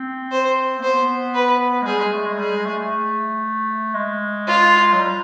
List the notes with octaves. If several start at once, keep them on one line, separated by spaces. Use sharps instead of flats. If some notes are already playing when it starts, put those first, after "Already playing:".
Already playing: C4
C5
A#3
B3 C5
B4
G#3
G3 G#4
G#3
A3
G#3
G3 G#4
G#3
A3
A3
G#3
F4
F#3
G3